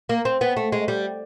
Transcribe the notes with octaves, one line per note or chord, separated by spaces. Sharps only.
A#3
C4
B3
A3
G#3
G3